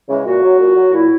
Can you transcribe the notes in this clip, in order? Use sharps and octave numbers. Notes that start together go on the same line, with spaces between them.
C#3 E3 G#3
A#2 F#4
F#3
A#2
F#3
A#2 E4